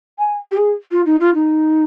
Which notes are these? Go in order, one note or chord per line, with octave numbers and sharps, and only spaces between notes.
G#5
G4
G#4
F4
D#4
F4
D#4